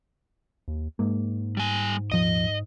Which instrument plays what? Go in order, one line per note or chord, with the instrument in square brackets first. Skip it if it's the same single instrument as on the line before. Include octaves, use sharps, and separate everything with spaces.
[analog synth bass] D#2
[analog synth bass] G#2 [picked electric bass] G#3 A#3
[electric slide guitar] G3 G#5
[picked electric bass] D#1 F3 [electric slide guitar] D#5